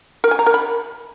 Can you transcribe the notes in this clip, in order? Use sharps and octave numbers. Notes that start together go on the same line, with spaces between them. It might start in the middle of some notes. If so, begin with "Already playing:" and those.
A#4
G#5
A#5
A#4
B5